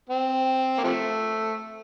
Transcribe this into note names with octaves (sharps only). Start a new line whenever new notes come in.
C4
A#3
C3 F3 A3